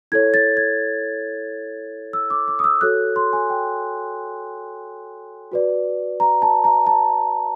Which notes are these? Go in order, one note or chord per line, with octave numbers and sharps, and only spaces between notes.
E4 A4 C#5 G#6
A6
G#6
E6
D6
D6
D#6
E6
F#4 A4 C#5 F#6
C6
G#5
G5
F#4 B4 D5
A#5
A5
A#5
A5